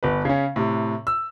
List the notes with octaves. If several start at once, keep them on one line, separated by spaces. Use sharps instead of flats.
G1 B4
C#3 C#4
A2 C3
E6